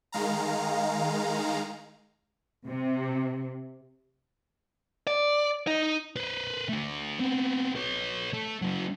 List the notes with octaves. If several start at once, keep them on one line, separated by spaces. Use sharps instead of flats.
D#3 G#3 F5 A#5
C3
D5
D#4
B4 C5
A3 D4
B3 C4
B4 C#5
A3
C#3 F#3